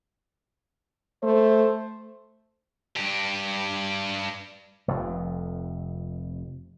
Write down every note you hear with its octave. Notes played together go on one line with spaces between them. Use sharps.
A3 C5
G2 G4
F1 F2